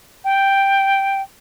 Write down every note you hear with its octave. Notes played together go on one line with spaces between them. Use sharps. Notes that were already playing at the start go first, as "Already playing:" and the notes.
G5